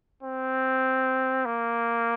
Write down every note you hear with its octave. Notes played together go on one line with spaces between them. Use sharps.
C4
A#3